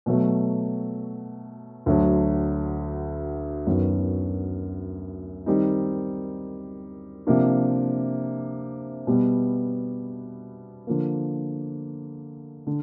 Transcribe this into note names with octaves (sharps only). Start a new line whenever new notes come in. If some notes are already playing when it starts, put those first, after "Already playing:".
B2 F#3 A3
D2 D3 F#3
F#2 D#3 F#3 B3
D#3 G3 C4 D#4
C3 F3 A#3 D4
B2 G3 B3
D3 F3 A#3
D3